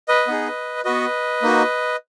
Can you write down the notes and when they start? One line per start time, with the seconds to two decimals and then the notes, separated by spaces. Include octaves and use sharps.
0.08 B4 D#5
0.28 B3 D#4 G#4
0.85 B3 F#4 B4 D#5
1.42 A#3 D#4 F#4